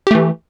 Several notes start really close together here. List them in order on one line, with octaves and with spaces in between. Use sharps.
G4 A3 E3